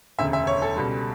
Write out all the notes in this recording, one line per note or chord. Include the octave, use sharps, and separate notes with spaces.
E1 D2 C#3 E5
E5
C#5
A4
C#2 B2 G3